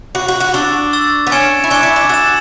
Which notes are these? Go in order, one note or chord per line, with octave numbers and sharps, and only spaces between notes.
F#4 B5 D6 F#6
F#4
F#4
D4 C#6 E6 A6
C#6 E6 A6
B3
C#4 G#5 C#6 G#6 C#7 E7
E4
D4 G#5 C#6 G#6 C#7 E7
E4
D4
F#4 E6 A6 E7